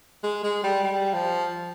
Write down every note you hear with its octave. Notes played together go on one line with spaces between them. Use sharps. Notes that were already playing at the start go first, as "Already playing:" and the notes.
G#3
G#3
G3
G3
F3